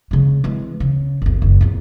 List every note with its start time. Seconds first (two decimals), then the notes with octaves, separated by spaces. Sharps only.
0.11 C#3 G#3
0.44 E3 G#3
0.80 C#3
1.22 G1 D#2
1.42 F#1
1.61 E2 A#2